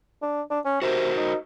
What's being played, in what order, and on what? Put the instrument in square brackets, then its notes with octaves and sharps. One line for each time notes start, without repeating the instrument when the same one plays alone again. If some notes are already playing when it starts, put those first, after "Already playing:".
[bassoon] D4
D4
C#4
[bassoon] C3 [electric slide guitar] F#4 A#4 C5
[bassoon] D#4